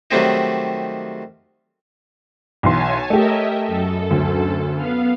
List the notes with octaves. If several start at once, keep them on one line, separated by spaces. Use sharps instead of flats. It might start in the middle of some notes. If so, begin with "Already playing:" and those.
D#3 F#3 G3 A3 C4 D#4
B1 E3 C#5 G#5 A5 C6
A3 G4 A#4 D#5 E5
F#2 A4
D2
B3 F5